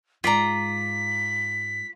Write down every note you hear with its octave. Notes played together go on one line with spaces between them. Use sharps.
G#2 F4 D5 A#5 B6